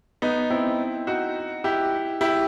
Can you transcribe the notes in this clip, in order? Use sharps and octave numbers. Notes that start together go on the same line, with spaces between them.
B3 D#4
C4 E4
D#4 F#4
E4 G4
E4 G4